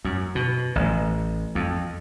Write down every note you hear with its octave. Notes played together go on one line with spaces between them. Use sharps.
F#2
B2
A1
F2